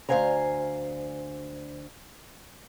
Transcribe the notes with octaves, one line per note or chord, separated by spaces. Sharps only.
D2 C#3 C5 F5 G#5 A#5